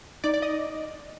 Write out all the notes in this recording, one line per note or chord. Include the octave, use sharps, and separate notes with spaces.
D#4 D5
D5
D#5